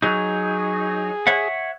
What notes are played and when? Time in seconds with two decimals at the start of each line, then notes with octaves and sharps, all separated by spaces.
0.02 F#3 D#4 G#4
1.27 C#5 E5 F#5